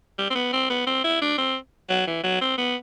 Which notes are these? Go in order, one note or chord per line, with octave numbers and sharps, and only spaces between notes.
G3
C4
B3
C4
B3
C4
E4
D4
C4
F#3
E3
F#3
C4
B3